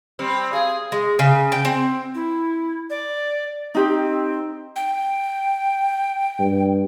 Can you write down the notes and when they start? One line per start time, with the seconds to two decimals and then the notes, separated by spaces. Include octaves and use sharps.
0.19 G3 C4
0.53 G#4 F5
0.92 G#3
1.19 C#3
1.52 G5
1.65 C4
2.15 E4
2.90 D5
3.75 C4 D#4 G4
4.76 G5
6.39 G2